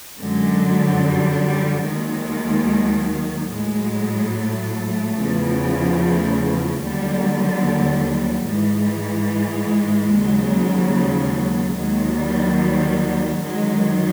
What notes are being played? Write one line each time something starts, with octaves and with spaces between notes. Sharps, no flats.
F#2 D3 F#3 G#3
G3
G3
D#2 D#3 F#3 G#3
A2 F#3 G#3
A3
E2 C#3 F3
A3
D#2 D3 F#3 G3
G3
G#2 E3 G#3
D#2 C#3 F#3
D#2 D#3 F#3 G#3
G3
G3
F#2 D#3 F#3 G#3